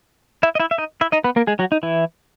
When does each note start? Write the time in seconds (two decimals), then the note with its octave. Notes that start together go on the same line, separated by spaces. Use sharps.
0.43 E4 E5
0.55 D#5
0.60 E4 E5
0.71 E5
0.78 D#4 D#5
1.01 E4 E5
1.12 D#4 D#5
1.24 B3 B4
1.36 A#3 A#4
1.47 G#3 G#4
1.59 F#3 F#4
1.72 D#4
1.83 E3 E4